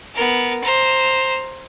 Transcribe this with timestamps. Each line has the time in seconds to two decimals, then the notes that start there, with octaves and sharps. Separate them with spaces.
0.15 B3 A#4
0.64 C5 A#5